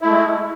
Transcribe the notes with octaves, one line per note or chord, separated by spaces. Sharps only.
G#3 A3 E4